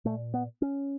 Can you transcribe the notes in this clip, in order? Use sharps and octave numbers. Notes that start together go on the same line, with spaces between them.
A#2 A3
B3
C#4